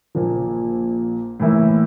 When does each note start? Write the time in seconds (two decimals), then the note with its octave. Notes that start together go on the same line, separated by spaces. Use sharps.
0.15 A#1 A#2 F3 A#3
1.40 A2 E3 A#3 E4